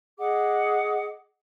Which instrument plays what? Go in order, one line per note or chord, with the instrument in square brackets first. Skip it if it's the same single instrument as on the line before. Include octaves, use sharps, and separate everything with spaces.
[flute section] G#4 D#5 F#5 D6